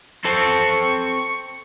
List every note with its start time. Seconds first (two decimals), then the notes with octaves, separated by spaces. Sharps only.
0.25 C4 A4 C#6